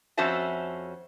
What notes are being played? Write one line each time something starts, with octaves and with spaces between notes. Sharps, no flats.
F2 C#4 F#4 C5 E5 A5